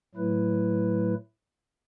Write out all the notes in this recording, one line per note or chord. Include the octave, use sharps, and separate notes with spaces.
A2 F#3 A3 E4 B4